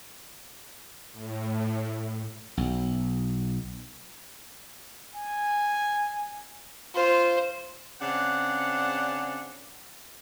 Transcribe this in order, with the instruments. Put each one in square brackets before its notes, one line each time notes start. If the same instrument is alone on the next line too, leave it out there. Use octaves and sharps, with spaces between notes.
[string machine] A2
[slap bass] B1
[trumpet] G#5
[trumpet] F4 [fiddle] C5
[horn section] C#3 C4 D4 F#5